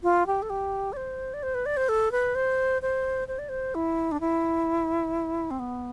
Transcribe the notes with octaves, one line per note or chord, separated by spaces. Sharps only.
F4
G4
A4
G4
D5
C5
D5
C5
B4
D5
C5
A4
B4
C5
C5
C5
D5
C5
E4
D4
E4
C4
B3